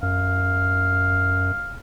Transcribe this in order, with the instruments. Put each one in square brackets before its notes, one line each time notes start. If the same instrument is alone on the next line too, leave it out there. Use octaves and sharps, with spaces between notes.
[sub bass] F#2 [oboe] F5